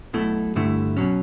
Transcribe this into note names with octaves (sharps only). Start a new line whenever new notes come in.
B1 B2 A3 E4
G2 D3 A3 E4
B2 F#3 C#4